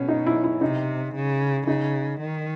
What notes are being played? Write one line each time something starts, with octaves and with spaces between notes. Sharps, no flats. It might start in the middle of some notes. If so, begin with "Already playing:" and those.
Already playing: B2 C#4
D#4
E4
E4
C3 D#4
C#3
C#3 D#4
D#3